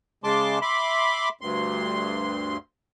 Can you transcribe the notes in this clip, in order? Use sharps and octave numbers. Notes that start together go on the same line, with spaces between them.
C#3 G#3 A5 C6 D6
E5 B5 C6 D6
D2 G2 C6